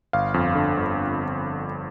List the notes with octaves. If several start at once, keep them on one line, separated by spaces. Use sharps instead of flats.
G1 F5
F2
D3
G1